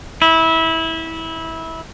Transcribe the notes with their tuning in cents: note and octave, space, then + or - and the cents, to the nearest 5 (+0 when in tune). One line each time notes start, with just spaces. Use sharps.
E4 -20